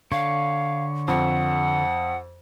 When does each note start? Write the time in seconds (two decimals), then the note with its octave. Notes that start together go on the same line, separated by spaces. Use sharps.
0.12 D3 C#5 F5
1.08 F2 F#5